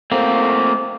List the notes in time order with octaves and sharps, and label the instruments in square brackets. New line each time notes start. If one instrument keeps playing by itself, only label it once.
[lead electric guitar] A3 C4 [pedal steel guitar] A#3